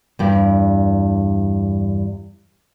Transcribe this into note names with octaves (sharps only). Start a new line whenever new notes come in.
E2 G2